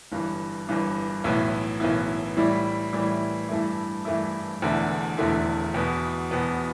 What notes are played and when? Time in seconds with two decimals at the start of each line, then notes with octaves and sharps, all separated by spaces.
0.12 G1 G2 E3
0.69 G1 G2 E3
1.24 B1 A2 E3 B3 E4
1.80 B1 A2 E3 B3 E4
2.37 A2 E3 G3 E4
2.93 A2 E3 G3 E4
3.49 G2 E3 A3 E4
4.05 G2 E3 A3 E4
4.62 E1 E2 D3 A3 E4
5.18 E1 E2 D3 A3 E4
5.74 E2 B2 B3
6.31 E2 B2 B3